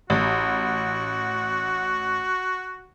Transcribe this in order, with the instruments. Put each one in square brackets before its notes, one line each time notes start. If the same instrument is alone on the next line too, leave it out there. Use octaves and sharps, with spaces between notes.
[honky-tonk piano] A1 [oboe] F#4